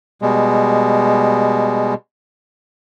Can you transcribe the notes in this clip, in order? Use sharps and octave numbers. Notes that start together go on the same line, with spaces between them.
B2 G3 G#3